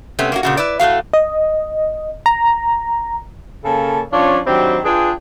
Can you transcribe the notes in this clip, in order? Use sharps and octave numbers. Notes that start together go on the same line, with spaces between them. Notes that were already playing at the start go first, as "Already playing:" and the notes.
C3 A3 B3 C#4
A#3 C#4 F#4
A#2 C#3 F#4
E4 B4 D5
A2 A3 F#4 F5
D#5
A#5
C#3 A#3 C#4 A4 A5
F3 C#4 D4 F4 C#5
D#3 F#3 C4 D4 E4 G4
D4 F4 G#4 B4 G5 G#5